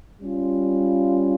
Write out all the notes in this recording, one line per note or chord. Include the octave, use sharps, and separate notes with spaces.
G3 C#4 F4